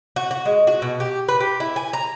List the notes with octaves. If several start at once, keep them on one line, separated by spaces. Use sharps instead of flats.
F#4
F#4
G#3
F#4
B2
G4
B4
G4
E4
G#5
A#5